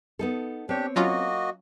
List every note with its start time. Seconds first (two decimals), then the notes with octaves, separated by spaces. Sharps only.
0.19 B3 D#4 A4
0.69 C4 D4 G4 C#5
0.96 F#3 A#3 C#4 F4 F#4 D#5